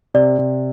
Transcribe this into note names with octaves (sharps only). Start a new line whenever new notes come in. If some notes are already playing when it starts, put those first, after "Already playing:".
C3 D5
C3